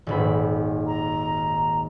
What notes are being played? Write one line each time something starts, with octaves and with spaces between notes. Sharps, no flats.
D#1 G#1 B5
A#5